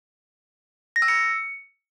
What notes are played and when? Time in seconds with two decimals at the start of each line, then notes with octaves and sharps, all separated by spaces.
0.96 A#6
1.02 E6
1.08 C#7